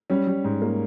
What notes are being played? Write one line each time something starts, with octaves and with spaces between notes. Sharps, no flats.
G3 C#4
G3
G#2
A#3